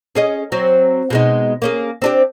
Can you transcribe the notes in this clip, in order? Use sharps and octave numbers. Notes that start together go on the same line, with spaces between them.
C#4 G#4 D#5
F#3 C4
B2 G#3 D#4
A#3 C#4 G#4
C4 D4 G4